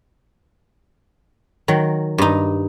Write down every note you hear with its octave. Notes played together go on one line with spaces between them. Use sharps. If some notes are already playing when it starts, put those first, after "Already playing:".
D#3 F#3
G2 D#4